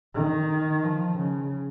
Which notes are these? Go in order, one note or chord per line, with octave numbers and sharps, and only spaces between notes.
D#3
F3
C#3